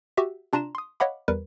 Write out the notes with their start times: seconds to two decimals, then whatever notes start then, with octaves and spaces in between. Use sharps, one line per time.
0.17 F#4 G4 E5
0.53 C3 D4 F4 A#5 C6 E7
0.75 C6 D#6
1.00 C#5 D#5 F5 F#5 B5 D6
1.28 E2 G3 A#4 B4